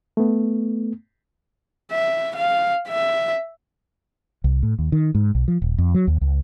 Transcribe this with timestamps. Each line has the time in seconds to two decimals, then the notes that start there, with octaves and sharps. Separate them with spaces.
0.17 A3 B3
1.92 E5
2.36 F5
2.88 E5
4.44 C2
4.63 A2
4.79 D#2
4.92 D#3
5.15 G#2
5.35 B1
5.48 F3
5.62 D#1
5.78 F2
5.94 F#3
6.07 D#2
6.21 C#2